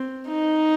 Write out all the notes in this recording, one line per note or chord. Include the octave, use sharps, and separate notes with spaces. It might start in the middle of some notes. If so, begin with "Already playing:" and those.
Already playing: C4
D#4